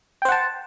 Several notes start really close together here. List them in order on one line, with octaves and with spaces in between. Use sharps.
G5 C5 F#5 A5